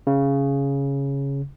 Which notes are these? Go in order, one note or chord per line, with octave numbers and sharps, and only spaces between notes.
C#3